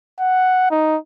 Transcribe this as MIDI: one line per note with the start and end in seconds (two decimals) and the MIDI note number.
0.20 0.68 78
0.71 0.97 63